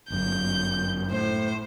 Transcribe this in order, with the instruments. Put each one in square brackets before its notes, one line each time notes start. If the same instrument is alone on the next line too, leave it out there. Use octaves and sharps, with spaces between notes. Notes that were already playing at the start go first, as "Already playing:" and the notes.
[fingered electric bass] G1 F#2 [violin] G6
[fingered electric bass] A2 [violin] C5